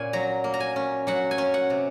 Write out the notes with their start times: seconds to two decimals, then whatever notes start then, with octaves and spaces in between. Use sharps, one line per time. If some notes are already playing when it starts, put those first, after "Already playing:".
Already playing: A#2 A#3 C#4 G#5
0.13 F#3 A#5
0.44 A#3
0.54 A#5
0.60 G#5
0.76 C#4
1.07 F#3 F#5
1.31 G#5
1.38 C#4
1.54 F#5
1.70 C3